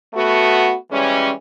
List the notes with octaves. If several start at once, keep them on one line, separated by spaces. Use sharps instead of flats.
A3 B3 F#4
E3 G3 G#3 C#4